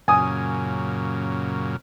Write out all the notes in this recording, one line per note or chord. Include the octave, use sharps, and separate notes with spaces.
F#2 A#2 C#3 G#5 D#6